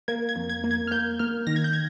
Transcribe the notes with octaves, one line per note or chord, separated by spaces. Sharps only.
A#3 G#6
G#6
F2
G#6
A#3
G#6
F6
A#3 G6
A#3 F6
D#3 A#6
G#6
G6
G#6